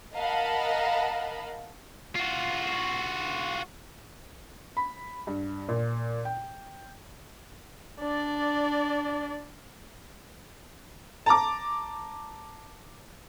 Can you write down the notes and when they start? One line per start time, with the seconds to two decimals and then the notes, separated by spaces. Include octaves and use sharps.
0.13 A#4 D#5 F5 F#5 A5 B5
2.15 F4 F#4
4.77 B5
5.27 G2
5.69 A#2
6.25 G5
8.00 D4 D5
11.26 A5 A#5 D6